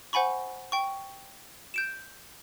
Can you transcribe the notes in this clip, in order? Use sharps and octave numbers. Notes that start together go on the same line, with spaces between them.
C5 F#5 G#5 B5 C#6
G5 C#6
G6 D7 E7